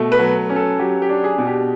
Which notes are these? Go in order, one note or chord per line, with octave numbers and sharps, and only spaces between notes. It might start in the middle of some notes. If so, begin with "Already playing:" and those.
Already playing: B2 A3
B4
F#3
C#4
A4
F#3 G4
G4
D4
G#4
B2
G4